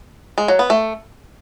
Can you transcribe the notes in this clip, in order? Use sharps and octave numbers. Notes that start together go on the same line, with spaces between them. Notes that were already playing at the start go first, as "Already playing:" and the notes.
G#3
F#3
B3
A3